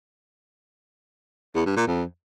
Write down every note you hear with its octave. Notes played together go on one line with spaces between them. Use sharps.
E2
G2
A#2
F2